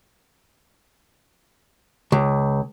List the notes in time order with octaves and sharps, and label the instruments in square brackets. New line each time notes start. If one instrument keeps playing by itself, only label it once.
[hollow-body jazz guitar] C#2